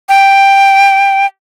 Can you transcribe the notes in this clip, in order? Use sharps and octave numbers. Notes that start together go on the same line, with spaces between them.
G5